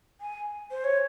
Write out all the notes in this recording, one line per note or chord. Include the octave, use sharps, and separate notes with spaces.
G#5
C5
C#5